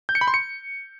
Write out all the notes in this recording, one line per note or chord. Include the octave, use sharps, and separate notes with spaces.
G6
C#7
B5
C6
C#7